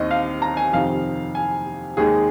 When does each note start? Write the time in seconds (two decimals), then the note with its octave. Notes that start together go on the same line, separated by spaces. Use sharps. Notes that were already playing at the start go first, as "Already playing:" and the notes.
Already playing: D#2 D#3 C4 D#5
0.11 F5
0.42 A#5
0.57 G#5
0.73 F2 C3 D#3 F5
1.35 G#5
1.97 D#2 D#3 G#3 G#4